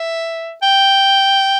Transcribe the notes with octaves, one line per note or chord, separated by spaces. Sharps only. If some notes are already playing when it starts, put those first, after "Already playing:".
Already playing: E5
G5